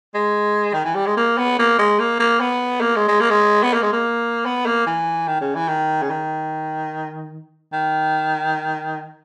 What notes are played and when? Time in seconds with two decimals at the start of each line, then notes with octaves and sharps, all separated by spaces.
0.14 G#3
0.74 D#3
0.85 E3
0.95 G3
1.06 G#3
1.17 A#3
1.38 B3
1.59 A#3
1.78 G#3
1.99 A#3
2.19 A#3
2.40 B3
2.81 A#3
2.96 G#3
3.08 G#3
3.20 A#3
3.30 G#3
3.63 B3
3.73 A#3
3.82 G#3
3.92 A#3
4.45 B3
4.66 A#3
4.86 E3
5.28 D#3
5.41 C#3
5.56 E3
5.68 D#3
6.02 C#3
6.10 D#3
7.73 D#3